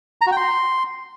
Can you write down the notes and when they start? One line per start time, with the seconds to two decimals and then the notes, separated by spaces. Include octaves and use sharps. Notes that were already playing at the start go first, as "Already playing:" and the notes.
0.21 A#5
0.27 F#4
0.32 G5
0.37 C6